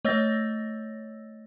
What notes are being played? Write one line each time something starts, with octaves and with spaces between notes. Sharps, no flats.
A3 C#5 D#5 E6 A6 A#6